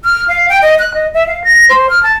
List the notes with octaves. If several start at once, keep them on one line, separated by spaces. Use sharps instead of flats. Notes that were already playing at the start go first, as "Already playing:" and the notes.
F6
F5
G5
D#5
F#6
D#5
E5
F5
A#6
C5
F6
A5